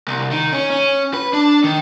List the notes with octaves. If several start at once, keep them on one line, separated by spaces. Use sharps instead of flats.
C2
D#3
C#4
C#4
B4
D4
D#3